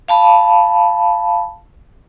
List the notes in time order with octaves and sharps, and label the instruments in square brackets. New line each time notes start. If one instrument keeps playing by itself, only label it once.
[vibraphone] F5 A5 B5